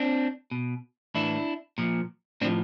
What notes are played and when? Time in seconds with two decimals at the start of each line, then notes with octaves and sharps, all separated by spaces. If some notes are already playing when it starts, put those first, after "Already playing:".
Already playing: C4 D4
0.51 B2
1.15 A2 E3 D4 E4
1.78 A#2 F3
2.41 A2 C4 D4
2.45 F3